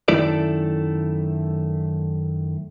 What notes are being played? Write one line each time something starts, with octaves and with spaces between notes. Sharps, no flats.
F#2 D#3 A3 E4 A4 D5